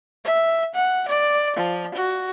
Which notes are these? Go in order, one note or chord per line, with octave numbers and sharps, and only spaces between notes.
E5
F#5
D5
F3
F#4